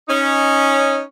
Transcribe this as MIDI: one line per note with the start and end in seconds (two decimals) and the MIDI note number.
0.08 1.01 61
0.08 1.01 63